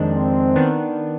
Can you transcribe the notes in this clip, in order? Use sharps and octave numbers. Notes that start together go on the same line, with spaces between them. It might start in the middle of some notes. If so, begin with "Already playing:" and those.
Already playing: F2 D#3 G#3 D4
C4
D#3 B3 D4